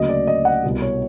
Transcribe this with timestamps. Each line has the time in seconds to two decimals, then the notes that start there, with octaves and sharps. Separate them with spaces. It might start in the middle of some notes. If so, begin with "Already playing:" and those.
Already playing: D2 C#3 F#3 A#3 D#5
0.09 D5
0.27 D#5
0.45 F#5
0.64 C2 B2 G3
0.82 C#5